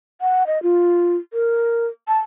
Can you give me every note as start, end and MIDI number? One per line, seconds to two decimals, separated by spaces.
0.21 0.46 78
0.47 0.61 75
0.63 1.16 65
1.33 1.87 70
2.08 2.18 81